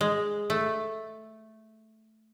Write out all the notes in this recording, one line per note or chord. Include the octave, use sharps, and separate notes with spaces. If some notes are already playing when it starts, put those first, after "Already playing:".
G#3
A3